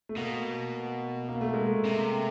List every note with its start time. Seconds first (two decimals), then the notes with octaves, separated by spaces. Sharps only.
0.09 A3
0.16 B2 A#3
1.29 A#3
1.41 A3
1.54 G#3
1.66 A3
1.85 C3